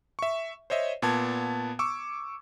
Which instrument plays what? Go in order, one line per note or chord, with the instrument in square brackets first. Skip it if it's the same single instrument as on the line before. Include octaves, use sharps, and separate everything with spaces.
[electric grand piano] E5 C#6
C5 C#5 D#5 E5
A#2 B3 A5 G#6
C#6 D6 E6